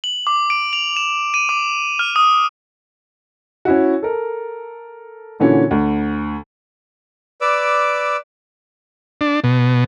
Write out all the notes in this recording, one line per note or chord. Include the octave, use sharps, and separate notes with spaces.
F#7
D6
D7
F7
E7
D#7
D6
F6
D#6
C#4 E4 F#4
A4 A#4
A#2 D3 E3 C#4 F#4
D2
B4 D5 D6 E6
D4
B2